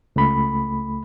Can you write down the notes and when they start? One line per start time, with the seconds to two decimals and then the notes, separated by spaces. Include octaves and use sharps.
0.16 C#2 A3 B5